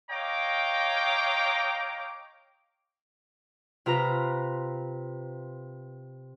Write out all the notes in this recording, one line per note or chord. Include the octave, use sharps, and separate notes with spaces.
C#5 D#5 F5 G5 A#5 D6
C3 F4 B4 A#5